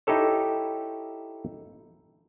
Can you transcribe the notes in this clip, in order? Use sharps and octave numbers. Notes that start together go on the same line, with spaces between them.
D#4 E4 G4 A4 C#5